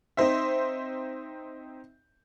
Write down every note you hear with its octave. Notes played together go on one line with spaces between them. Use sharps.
C4 D#4 C5 E5